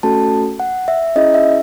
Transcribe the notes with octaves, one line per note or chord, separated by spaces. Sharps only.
A3 C#4 F#4 A4 A5
F#5
E5
C#4 E4 G#4 D#5
E5